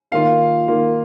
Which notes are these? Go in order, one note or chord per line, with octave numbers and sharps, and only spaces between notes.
D#3 A#3 F4 F5
D#3 A#3 F4